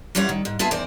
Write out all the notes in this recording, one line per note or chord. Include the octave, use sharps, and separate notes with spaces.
F#2 E3 G3 F4 C#5 F#5
D#3
G#2
B3 F4 G#4 E5 A5
E2 D#3 E3 C5 D5